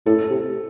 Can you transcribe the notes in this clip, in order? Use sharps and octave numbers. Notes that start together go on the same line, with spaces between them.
A2 A4
C3